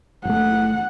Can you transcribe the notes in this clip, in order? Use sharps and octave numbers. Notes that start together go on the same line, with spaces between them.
F#1 A3 F#5